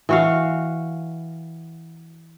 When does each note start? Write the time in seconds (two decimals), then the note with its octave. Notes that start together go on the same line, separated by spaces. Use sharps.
0.09 E3 F#4 F5